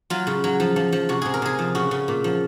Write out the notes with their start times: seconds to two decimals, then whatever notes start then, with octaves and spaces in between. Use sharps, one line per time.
0.10 F#3 F4
0.27 C#3
0.44 F#3
0.60 F3
0.76 F3
0.92 F3
1.09 C3 F#4
1.22 C3 G#4
1.34 A#4
1.42 C3 G#4
1.59 F3
1.75 C#3 F#4
1.91 C#3
2.08 A#2
2.24 F3